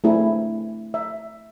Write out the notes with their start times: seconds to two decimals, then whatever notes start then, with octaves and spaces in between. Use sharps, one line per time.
0.04 A3 C4 D4 E4 G#4
0.94 E5